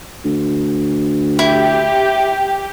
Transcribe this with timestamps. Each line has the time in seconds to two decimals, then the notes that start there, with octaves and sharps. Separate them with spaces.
0.25 D2
1.39 E4 G4